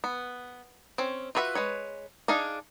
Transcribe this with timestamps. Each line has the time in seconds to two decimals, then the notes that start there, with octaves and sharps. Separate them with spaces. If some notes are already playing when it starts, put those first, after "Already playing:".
0.04 B3
0.98 C4 C#4
1.35 F4 F#4 B4 C#5 E5
1.55 G#3 B4 C#5
2.28 D4 D#4 G#4 F5